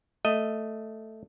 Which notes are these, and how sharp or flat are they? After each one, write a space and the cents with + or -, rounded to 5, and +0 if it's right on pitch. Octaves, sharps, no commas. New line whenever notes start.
A3 +0 D#5 +0